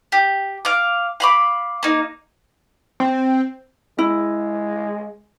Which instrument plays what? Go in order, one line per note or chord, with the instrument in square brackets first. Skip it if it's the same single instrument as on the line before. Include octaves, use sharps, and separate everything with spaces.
[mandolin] G4
F5 D6
F5 B5 D6
A#3 D#4
[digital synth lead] C4
[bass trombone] G#3 [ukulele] E4